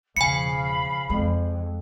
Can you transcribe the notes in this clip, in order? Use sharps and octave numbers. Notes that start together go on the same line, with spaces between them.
E1 C#3 F3 F5 G#5 B5 C#7
F2 G#3